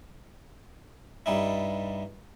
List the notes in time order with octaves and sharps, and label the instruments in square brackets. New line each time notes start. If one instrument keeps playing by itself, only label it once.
[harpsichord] G2 G3 D#4 E4